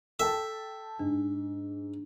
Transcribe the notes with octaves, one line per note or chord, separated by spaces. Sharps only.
A4 E5 G5 A5
G#2 D4